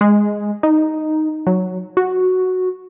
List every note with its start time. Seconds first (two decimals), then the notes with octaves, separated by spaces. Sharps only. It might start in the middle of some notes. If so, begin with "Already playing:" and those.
0.01 G#3
0.63 D#4
1.47 F#3
1.97 F#4